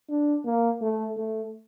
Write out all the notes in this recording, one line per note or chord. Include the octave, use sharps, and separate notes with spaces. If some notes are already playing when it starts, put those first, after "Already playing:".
D4
A#3
A3
A3